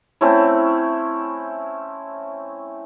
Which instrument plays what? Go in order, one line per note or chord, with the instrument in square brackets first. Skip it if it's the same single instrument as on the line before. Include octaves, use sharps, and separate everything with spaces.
[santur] A3 C4 C#4 E4